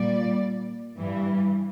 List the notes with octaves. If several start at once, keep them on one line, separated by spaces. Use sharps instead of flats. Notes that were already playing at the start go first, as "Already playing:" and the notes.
Already playing: A#2 G3 D5
G2 E3 G3